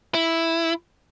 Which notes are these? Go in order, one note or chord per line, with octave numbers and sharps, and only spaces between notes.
E4